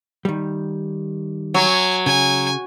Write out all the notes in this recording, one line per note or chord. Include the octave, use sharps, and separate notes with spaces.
D#3 G3
F#3 G#5
C#3 G#5